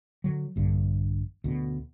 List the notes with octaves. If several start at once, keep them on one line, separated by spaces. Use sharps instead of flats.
D3 F#3
A#1 G2 D3
D2 B2